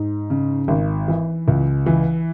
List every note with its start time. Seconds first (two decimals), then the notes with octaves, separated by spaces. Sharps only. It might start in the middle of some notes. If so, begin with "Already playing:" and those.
Already playing: G#2
0.30 C#3
0.68 G#1
1.08 E3
1.48 C#2
1.86 E3